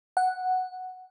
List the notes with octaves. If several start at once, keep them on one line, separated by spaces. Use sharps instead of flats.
F#5